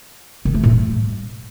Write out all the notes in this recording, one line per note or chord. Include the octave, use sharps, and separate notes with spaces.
D#3
A3
A2
G3